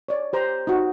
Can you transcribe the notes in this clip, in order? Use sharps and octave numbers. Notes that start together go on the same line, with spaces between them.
C#5 D5
G4 C5 A#5 D6
D#4 F#4